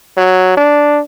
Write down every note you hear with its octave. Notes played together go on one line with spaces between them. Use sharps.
F#3
D4